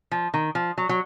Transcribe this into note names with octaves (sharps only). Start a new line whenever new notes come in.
F3
D#3
F3
F#3
F#3